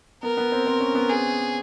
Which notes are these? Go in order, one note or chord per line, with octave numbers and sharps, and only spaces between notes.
B3 A#4
B3
C4
C4
C#4
B3
G#4